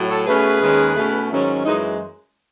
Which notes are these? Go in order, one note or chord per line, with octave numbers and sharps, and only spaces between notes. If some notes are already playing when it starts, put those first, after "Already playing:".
Already playing: A2 F#3
A4 C#5
B2 A3 C#4 G#4 B4
D#2 D#3 G#3 C#4
B2 A3 C#4
G#2 D#3 F#3 C#4
F#2 E3 G#3 D#4